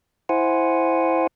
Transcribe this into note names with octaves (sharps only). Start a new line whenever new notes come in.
E4 C5 F#5 G#5